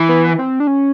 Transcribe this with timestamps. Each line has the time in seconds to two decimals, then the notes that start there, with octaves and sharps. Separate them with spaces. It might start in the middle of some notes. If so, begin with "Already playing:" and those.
Already playing: E3
0.09 B3
0.39 C4
0.60 D4
0.67 C#4